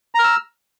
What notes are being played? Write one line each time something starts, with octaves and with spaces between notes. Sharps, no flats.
A#5 E6 F6